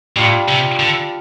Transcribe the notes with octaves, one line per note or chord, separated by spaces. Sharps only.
A2 G3 D4 F4
C3
D3